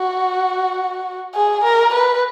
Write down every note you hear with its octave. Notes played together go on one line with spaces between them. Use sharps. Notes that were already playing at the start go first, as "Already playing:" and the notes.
Already playing: F#4
G#4
A#4
B4